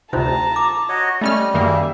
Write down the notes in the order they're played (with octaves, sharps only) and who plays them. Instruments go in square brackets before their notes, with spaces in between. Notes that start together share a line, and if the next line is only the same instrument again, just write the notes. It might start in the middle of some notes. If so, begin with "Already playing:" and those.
[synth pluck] D2 C3 [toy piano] D#4 F4 C5 [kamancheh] A5 A#5
[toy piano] D6
[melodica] F#4 C#5 D#5
[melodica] G3 [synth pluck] A3 C#4 F6 [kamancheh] D#5
[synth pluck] F#2 D#3 A#3 [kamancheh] G#4 E5